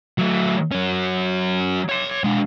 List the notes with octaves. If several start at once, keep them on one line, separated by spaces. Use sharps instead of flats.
F#3 A3
F#3 C#4
C#5 C6
G#3 D4